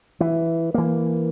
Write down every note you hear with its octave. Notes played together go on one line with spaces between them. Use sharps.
E3
E3 A#3